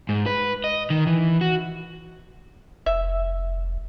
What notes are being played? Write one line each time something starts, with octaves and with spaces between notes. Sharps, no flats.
G#2
B4
D#5
D#3
E3
F#4
F1 E5